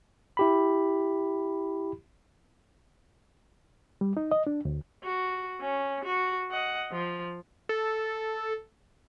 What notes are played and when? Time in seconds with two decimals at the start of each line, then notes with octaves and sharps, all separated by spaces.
0.37 E4 G4 B5
4.01 G3
4.17 D#4
4.31 D#5
4.47 D4
4.65 D2
5.04 F#4
5.61 C#4
6.05 F#4
6.51 D#5 F#5
6.92 F3
7.69 A4